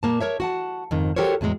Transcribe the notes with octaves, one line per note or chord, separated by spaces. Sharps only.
A#2 A#3 A5
A#4 C#5 E5
F#4 F#5 A5
F2 G#2 D#3
F#4 G4 A4 A#4 C5 C#5
E2 A2 F#3 G#3